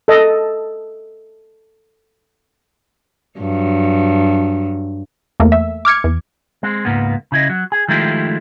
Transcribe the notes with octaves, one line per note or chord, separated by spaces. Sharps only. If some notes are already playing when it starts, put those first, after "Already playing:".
A4 D#5
G2 F#3
E2 A3 A#3
E5
D6 F6 G#6 C#7
E2
G#3 C4
C#2 G#2 A#3 B3
C#3 E4 D#5
F#3
G#4
D#3 F3 G#3 A3 E4 G4